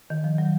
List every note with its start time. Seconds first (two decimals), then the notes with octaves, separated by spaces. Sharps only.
0.10 D#3
0.24 F3
0.38 F#3